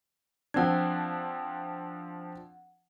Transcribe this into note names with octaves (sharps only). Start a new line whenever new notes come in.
F3 C4 D4 F#5 G#6